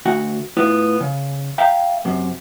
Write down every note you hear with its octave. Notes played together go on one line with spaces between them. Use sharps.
D2 F#4 F#5
A2 B3 E4 F4
C#3
E5 F5 G5 A#5
F#2 C3